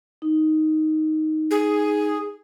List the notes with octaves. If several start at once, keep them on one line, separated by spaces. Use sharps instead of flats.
D#4
G#4